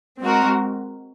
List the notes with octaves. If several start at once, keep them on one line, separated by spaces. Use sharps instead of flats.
G#3 C4 F#4 A#4